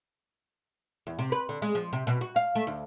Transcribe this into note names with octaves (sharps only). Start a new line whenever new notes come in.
E2
C3
B4
D3
G#3
F3
C3
B2
F#4
F5
A3
D2